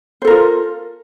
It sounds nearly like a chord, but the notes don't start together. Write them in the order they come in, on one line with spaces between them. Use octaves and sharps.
C5 A4 A#4 F4